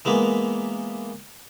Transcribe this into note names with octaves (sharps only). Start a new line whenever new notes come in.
E3 G#3 A#3 B3